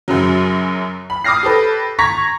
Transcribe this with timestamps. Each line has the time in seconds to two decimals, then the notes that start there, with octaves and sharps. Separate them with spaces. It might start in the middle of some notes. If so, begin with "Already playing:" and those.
0.08 F#2 C#3 F#3
1.10 B5
1.24 D6 D#6 F6 A#6 C7
1.43 G4 A4 B4
1.99 A#5 C#6 G#6 A#6 B6